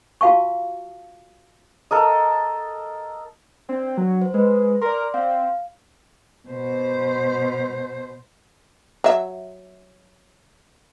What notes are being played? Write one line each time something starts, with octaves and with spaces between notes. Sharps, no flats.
F4 F#4 F5 A5 C#6
A4 A#4 D#5
C4 D4
F#3
C5
G#3 B4
A#4 D5 C6
C4 F5
B2 C5
F#3 E5